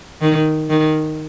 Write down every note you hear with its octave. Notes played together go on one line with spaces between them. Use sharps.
D#3
D#3